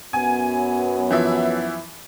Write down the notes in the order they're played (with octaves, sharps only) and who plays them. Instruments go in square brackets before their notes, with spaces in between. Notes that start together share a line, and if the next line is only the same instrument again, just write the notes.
[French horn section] F#2 F#3 B3 [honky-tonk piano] G#5
[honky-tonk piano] E3 F3 E5